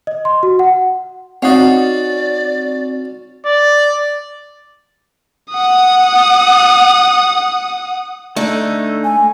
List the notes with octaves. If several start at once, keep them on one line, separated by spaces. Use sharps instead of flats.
D#5
C6
F#4
F#5
C4 C#4 D#4 F#4 D5 F5 F#5
D5
F#5 D#6
D3 A3 D#4
G#5